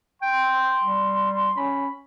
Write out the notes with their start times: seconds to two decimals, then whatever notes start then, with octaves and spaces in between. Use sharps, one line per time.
0.22 G5 C6
0.84 G3
1.57 C#4 B5